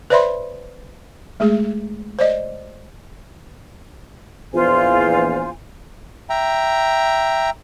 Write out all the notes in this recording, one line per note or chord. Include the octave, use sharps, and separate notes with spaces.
B4 C5 D5 E5 B5 C6
G#3 A3 G#4
C5 D5 D#5
A#1 E2 F4 C5 G#5
E5 G5 A#5